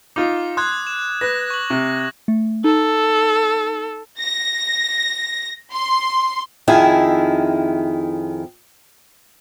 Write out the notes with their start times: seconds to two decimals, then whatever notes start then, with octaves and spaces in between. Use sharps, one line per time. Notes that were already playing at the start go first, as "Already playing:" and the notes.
0.16 D#4 F4 D6
0.57 C6 D#6 F#6 G#6
0.87 E7
1.21 B4 A#6
1.50 C#6 F#7
1.70 C3
2.28 A3
2.64 D#4 A4
4.19 A#6
5.73 C6
6.68 F2 D#3 E4 G#4